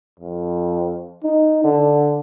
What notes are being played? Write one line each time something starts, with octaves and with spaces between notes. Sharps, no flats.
F2
D#4
D3